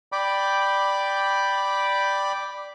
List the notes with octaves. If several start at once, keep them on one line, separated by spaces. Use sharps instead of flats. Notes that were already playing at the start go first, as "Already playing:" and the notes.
D5 G5 B5 D6